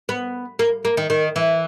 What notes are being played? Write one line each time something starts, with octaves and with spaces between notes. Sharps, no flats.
B3
A#3
A#3
D#3
D#3
E3